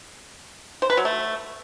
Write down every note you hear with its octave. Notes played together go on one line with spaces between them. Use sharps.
C5
B4
F#3
A3